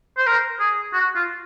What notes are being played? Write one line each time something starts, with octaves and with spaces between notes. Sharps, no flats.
C5
A#4
G#4
F#4
F4